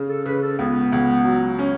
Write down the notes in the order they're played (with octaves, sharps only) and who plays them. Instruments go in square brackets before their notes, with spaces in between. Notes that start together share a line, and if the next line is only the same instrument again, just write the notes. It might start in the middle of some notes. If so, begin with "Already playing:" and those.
Already playing: [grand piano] C#3
[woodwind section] A4
[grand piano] C#3 [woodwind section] B4
[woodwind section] A4
[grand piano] C#2 [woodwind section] B3
[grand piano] C#2
F#3
C#4